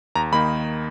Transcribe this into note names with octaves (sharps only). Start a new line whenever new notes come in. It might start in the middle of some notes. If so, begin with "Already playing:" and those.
D#2 A#5
D#3 A#3 D#4 B5